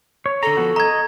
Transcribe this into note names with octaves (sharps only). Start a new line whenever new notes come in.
C#5
D3 A4 A#5
F3 B3 F#4
D#5 A#5 G#6